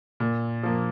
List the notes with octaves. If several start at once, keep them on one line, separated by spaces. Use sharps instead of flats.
A#2
F3 A#3